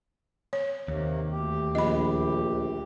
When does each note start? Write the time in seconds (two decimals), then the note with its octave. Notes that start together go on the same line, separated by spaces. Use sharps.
0.53 C#5
0.88 D#2 C3 D#3 A#3
1.32 D2 G4
1.75 A#1 D#5 B5